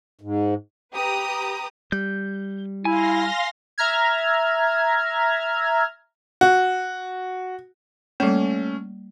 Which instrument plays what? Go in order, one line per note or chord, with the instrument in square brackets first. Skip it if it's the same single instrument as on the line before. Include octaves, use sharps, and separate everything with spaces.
[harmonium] G#2
[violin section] G4 B4 A#5 D#6
[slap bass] G3 [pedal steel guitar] G6
[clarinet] E4 [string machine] F5 C6 A#6 [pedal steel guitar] G#5
[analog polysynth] E5 A#5 F6 G#6
[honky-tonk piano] F#4
[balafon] G3 A#3 [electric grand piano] A3 C#4